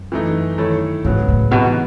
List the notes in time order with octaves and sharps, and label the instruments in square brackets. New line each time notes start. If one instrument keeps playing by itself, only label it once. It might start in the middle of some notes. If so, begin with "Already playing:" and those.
Already playing: [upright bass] F#2
[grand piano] E3 A3 D#4
D#3 A3 E4 A4 C#5
[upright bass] G#2 [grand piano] C#3 F#3 B3
[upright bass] A2
[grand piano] G#2 E3 B3 D#4 F#4 [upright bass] B2